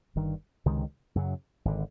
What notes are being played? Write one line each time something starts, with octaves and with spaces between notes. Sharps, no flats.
G1 G2 D#3
C#2 C3 D#3 G#3
F#2 C#3 F#3
G#1 D3